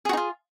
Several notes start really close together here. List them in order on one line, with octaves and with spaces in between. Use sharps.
G#4 F#4 D#4 F4